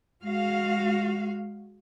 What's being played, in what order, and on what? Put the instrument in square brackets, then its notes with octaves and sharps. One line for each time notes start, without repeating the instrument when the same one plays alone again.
[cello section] G#3 F#4 F5